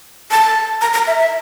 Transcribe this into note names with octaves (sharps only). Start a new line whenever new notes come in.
A5
A#5
A#5
E5
E5